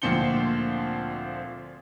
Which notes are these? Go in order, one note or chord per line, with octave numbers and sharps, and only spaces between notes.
D2 A#2 F3 C4 C#7 G7